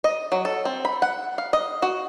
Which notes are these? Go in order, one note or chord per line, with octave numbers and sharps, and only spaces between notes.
D#5
F#3
A4
C4
B5
F#5
F5
D#5
F#4